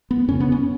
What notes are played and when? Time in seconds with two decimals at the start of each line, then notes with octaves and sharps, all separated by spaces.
0.11 B3
0.28 F#2 C#3 C#4
0.40 B3
0.52 C#4